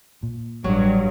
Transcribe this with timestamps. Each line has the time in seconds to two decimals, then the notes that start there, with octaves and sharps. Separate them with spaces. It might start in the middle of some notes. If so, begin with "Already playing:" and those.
0.23 A#2
0.64 A1 G2 F#3